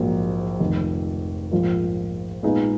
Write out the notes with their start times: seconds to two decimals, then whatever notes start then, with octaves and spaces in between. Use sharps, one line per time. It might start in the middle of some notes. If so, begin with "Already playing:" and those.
Already playing: A#1 G#2 F#3 A#3
0.60 F1 F2 D#3
1.51 A#1 G#2 F3 A#3 F4
2.43 A#2 G#3 B3 D#4 G#4